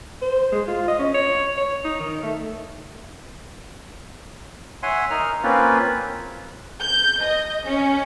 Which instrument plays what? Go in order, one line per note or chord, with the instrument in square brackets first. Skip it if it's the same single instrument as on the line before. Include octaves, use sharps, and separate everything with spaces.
[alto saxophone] C5
G#3
F4
D#5
C#4
C#5
C#5
D#4
D#3
A3
[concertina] C#5 E5 F#5 G#5 C6
D#4 A#4 F6
A#3 C4 C#4 F4 B4
[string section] G6
D#5
C#4